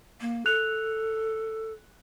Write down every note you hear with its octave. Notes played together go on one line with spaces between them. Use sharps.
A#3
A4 F#6 F7